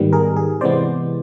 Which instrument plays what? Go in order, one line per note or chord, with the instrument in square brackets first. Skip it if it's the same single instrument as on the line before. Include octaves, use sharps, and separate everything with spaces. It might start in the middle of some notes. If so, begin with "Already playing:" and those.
Already playing: [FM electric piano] G#2 D#3 G3 B3
G#4 A#4
G#4
C3 E3 G#3 B3 C5 D5